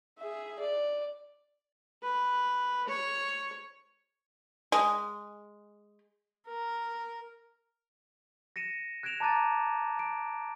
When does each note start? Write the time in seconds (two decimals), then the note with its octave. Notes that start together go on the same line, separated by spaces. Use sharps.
0.18 G#4 E5
0.59 D5
2.03 B4
2.88 C#5
4.72 G#3
6.47 A#4
8.56 A#6 C#7 D#7 E7
9.03 F#6 G#6 A#6 D7 E7 F7
9.20 A5 A#5 D6 F#6 A6 D#7
9.99 D7